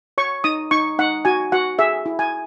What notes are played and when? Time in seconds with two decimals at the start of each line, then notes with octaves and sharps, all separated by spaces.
0.18 C#5 C#6
0.44 D#4 D#6
0.71 D#4 C#6
0.99 D#4 F#5
1.25 F#4 G#5
1.52 F#4 F#5
1.79 G#4 E5
2.06 E4
2.19 G#5